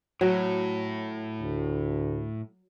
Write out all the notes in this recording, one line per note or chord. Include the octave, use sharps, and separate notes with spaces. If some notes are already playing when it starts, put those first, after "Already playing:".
A2 F#3
D2